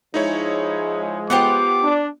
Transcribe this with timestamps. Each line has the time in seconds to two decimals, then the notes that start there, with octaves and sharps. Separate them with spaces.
0.14 F3 G#3 D#4 E4 C#5
1.30 B3 F4 G4 C5 F#5 D6
1.83 D4